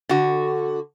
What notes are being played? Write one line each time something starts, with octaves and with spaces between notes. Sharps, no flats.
D3 F#4